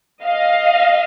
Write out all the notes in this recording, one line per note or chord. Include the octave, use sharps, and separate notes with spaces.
D#5 F5